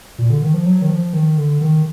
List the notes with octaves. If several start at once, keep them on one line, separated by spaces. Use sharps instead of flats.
A#2
D3
D#3
F3
F#3
D#3
F3
D#3
D3
D#3